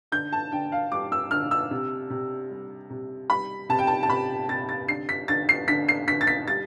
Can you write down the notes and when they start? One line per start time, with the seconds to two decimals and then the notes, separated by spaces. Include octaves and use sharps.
0.12 D3 G6
0.33 A5
0.52 D3 G5
0.72 F5
0.92 G3 D6
1.12 E6
1.31 D3 F6
1.51 E6
1.71 C3
2.10 C3
2.51 G3
2.90 C3
3.30 G3 B5
3.69 C3 A5
3.78 G5
3.87 A5
4.03 A5
4.09 C3 B5
4.49 C3 A6
4.69 A6
4.88 D3 C7
5.09 B6
5.28 D3 A6
5.49 C7
5.68 D3 B6
5.89 C7
6.08 D3 B6
6.21 A6
6.27 B6
6.48 G3 A6